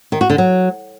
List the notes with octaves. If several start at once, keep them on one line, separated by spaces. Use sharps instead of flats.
D#3
F#4
D3
F#3